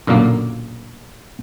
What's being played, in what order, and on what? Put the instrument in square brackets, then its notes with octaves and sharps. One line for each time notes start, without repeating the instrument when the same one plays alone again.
[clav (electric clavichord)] B1 F#2 A#2 D3 A#3